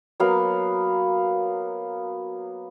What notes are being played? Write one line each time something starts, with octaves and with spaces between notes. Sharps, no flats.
F#3 A#3 B3 F5